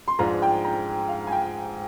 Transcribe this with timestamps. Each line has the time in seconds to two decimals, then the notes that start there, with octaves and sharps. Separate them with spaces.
0.08 C6
0.19 G#2 F3 G#3 D4 F4 A#5
0.42 G5
0.64 A#5
1.09 F5
1.27 G#5
1.32 G5